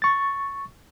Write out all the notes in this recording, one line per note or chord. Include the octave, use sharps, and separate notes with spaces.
C#6 A6